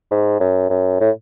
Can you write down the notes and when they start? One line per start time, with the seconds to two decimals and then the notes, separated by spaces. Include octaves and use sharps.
0.11 G#2
0.40 F#2
0.70 F#2
1.00 A2